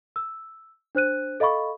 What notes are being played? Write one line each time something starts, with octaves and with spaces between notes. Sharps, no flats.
E6
D4 C5 F#6 D#7
A4 D#5 F5 B5 C#6